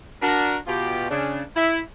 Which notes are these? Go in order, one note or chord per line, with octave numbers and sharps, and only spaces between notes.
D4 F#4 A#4
B2 F4 G4
C#3 D4
E4